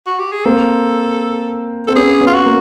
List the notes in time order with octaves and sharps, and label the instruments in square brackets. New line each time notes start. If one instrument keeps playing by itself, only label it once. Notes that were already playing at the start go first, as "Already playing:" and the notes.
[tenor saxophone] F#4
G4
G#4
[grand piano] A#3 C4 [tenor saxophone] A4
[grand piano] C4 [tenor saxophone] A4
[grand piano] B3 C#4 [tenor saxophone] G#4
[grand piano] B3 C#4
[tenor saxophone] F4
F#4
[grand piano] A#3